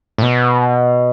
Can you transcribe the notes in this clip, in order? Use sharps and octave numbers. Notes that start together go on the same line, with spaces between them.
A2
B2